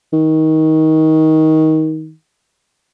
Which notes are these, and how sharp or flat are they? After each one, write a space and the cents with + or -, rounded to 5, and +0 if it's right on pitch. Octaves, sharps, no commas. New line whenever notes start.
D#3 +20